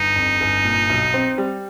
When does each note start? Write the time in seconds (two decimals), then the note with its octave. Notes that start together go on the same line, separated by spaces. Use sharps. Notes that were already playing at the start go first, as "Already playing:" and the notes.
Already playing: G1 D#4
0.16 F2
0.40 G1
0.64 A#2
0.89 B1
1.14 C4
1.38 G3